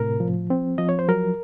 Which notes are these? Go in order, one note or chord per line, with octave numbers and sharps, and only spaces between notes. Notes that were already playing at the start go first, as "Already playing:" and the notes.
Already playing: A2 C3 A#4
F3
C4
F3 D#5
C#5
C5
F#3 A#4